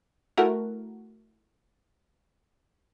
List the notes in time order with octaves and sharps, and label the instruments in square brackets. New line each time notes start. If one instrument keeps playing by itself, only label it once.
[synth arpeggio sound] A3 E4 F#4 A#4